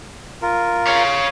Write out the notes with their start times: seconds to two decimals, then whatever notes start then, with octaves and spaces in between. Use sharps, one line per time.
0.42 F4 A#4
0.87 C#5 F5